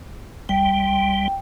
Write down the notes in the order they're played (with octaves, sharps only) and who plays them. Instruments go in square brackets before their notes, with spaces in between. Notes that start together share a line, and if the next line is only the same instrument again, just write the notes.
[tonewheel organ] C2 G3 [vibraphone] G5